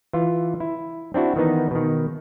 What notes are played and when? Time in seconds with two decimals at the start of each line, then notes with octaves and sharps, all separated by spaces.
0.13 E3 F4
0.60 E4
1.14 C4 D4 E4 F#4
1.36 D#3 E3 B3 D#4
1.71 B2 D#3